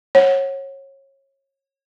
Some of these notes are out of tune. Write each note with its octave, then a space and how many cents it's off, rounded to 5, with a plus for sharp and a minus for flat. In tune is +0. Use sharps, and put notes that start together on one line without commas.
C#5 -25 F#5 +0